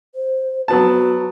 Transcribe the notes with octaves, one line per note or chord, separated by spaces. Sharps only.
C5
F#3 B3 F#4 A5